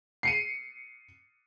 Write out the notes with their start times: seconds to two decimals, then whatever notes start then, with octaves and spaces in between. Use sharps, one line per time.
0.23 C7 C#7 D#7